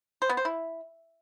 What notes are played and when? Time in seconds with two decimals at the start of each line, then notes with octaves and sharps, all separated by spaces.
0.22 C5
0.29 B3
0.37 C5
0.45 E4